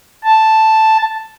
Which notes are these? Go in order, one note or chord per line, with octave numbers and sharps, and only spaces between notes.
A5